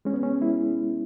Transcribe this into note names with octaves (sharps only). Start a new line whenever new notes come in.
G#3 C#4
B3
C#4
G#3 E4